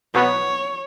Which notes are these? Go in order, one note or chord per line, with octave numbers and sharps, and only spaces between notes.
B2 F#3 B3 C#5